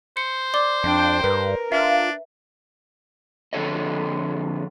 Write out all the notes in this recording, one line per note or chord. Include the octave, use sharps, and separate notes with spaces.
C5 C#7
D5 D6 G7
F2 D4 G5
G2 A#4 B4
D4 F4 E5
F2 D3 A4 C#5 D#5